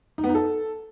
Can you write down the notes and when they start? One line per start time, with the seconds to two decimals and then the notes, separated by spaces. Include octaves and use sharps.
0.18 D#4
0.24 B3
0.29 D#4
0.35 A4